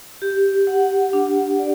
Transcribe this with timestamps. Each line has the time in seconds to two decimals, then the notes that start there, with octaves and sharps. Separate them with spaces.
0.22 G4
0.67 F#5
1.13 D4
1.59 D5